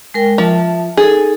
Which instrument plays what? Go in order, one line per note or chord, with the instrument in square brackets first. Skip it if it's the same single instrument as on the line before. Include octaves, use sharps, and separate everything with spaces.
[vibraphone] G#3 A#4 G5
[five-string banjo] F3 [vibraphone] E5 A5
[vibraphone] D#4 A4 [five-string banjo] G#4